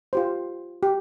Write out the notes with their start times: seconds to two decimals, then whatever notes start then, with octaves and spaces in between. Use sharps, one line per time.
0.13 F4 G4 C5
0.83 G4